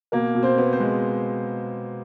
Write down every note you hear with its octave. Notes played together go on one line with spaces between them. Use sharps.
B2 A#3 A#4
B2
C4 C5
B3
C4 C5
G#3